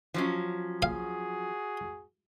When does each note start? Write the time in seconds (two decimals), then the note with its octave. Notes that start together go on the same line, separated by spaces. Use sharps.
0.14 F3 F#3 C#4
0.82 F#4 G#4 F5